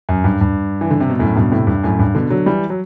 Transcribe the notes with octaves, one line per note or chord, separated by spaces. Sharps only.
F#2
G2
G2
E3
D3
C3
B2
F#2 A2
G2 B2
A2 C3
G2
F#2 A2
G2
B2 D3
D3 F#3
E3 G3
F#3